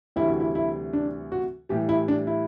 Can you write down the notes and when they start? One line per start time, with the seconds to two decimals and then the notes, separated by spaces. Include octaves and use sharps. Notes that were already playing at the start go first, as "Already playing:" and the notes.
0.16 D2 C3 E3 G3 E4
0.28 F#4
0.40 E4
0.55 E4
0.93 D4
1.32 F#4
1.69 A2 E3 G3 G4
1.89 E4
2.08 D4
2.27 E4